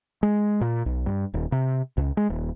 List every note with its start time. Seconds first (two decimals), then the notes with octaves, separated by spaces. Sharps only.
0.23 G#3
0.61 A#2
0.86 B1
1.06 G2
1.34 D#1
1.52 C3
1.97 C#2
2.17 G#3
2.30 D#1